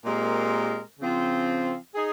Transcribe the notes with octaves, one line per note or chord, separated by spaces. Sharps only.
A#2 G#3 C4 G4 A#4
C#3 F3 C4 F4
D#4 G#4